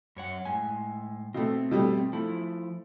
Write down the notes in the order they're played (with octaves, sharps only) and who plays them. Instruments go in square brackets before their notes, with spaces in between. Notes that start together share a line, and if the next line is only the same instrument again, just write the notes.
[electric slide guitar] F#2 C#5 F#5
A2 G#3 G#5
[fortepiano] B2 A3 [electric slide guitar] C4
[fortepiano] B2 G3 A3
[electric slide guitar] F3 E4 [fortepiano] A3